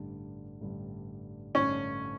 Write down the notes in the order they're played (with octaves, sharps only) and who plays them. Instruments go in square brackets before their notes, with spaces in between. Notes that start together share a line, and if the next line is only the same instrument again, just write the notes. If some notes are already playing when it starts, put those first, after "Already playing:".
Already playing: [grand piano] A1 G2 D3 G3
A1 G2 D3 G3
[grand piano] A1 G2 D3 G3 [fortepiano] C#4